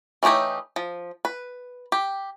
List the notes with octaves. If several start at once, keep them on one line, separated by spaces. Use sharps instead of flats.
E3 A3 D#4 G4 C#5
F3
B4
G4